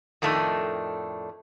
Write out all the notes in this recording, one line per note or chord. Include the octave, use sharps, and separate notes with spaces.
F2 A2 D#3 A3 D4 D#5